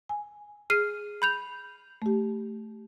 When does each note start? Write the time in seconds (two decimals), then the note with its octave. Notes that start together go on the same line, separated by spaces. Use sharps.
0.09 G#5
0.70 G#4 F6 C7 D#7
1.22 B5 G6 F7
2.02 A3 G4